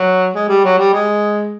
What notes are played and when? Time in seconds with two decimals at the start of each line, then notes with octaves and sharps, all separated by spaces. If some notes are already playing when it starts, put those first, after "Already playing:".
Already playing: F#3
0.34 G#3
0.49 G3
0.64 F#3
0.79 G3
0.93 G#3